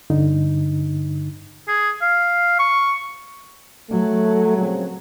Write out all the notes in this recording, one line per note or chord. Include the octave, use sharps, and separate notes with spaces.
G2 D3 D#4
G#4
F5
C#6
F#3 A3
A#2 C#3 C4